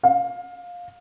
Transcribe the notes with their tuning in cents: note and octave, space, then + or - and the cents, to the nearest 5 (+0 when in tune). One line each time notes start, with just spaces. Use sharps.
F5 +15